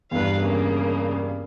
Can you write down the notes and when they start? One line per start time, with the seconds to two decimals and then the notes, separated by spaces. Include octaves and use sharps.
0.11 E2 G2 B4 F5
0.40 C#3 A#3